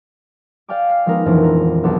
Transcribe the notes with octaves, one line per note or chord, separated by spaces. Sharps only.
D5 F5 G5 G#5 D6
F6 C7
F3 G#3 B3 D#4 A#4
D#1 F2 E3 C#4 D4
A#4
B1 B3 D4 G#4